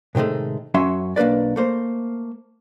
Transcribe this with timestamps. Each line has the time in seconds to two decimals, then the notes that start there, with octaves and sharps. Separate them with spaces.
0.15 A2 C3 D#3 G#3 A3
0.74 F#2 F#3 C#4 E5 C6
1.16 B1 A#3 D4 B4 D5
1.56 A3 A#3 C5